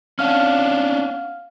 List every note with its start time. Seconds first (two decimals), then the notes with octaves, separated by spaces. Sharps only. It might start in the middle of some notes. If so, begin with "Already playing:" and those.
0.19 C#4 D4 F5 F#5 F6